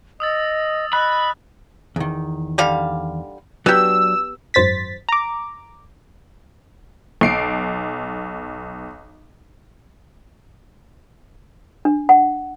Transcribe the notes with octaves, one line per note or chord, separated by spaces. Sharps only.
D#5 D#6 E6 A6
D#5 B5 E6 F#6
E2 D#3
D3 G3 F5
F#3 B3 D4 G4 E6
G#1 F#2 C5 A6 B6
A#5 D6
B1 C7 D7
D4
F#5